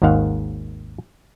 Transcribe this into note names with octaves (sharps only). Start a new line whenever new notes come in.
G#1 D#2 G#2 D#3 F5 F#5